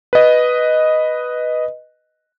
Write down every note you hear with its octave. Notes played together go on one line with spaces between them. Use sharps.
B4 D#5